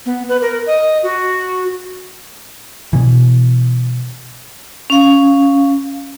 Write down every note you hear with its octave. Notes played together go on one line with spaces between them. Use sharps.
B3
B4
A#4
D#5
F#4
B2 E3
C#4 F5